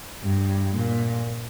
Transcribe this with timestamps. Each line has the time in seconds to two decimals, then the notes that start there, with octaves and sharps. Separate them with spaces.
0.23 G2
0.73 A#2